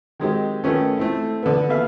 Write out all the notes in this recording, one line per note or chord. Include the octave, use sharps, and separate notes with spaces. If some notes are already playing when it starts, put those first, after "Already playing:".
D#3 F#3 G#3 C4 D#4 G4
D#3 A3 B3 C#4
A3 C4 E4
D3 B3
D#2 B2 B4 E5 F5